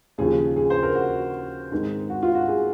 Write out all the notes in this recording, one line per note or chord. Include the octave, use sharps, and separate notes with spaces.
D#2 C#3 F3 G#4
G#4
C5
A#4
F#4
G#2 D#3 G#3 C4
F#4
F4
F#4
G#4